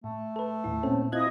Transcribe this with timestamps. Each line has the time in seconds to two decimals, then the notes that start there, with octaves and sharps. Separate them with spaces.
0.04 A2 A3
0.36 A4 B4
0.64 D#2 A2 E4
0.83 A#2 C4 C#4 A4
1.12 C4 E4 F4 D#5 D#6 F#6 G#6